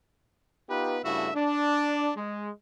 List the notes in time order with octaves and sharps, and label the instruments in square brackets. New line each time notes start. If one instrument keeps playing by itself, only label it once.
[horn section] B3 D#4 F4 G4 B4
G2 C#3 A3 E4 F#4 E5
D4
G#3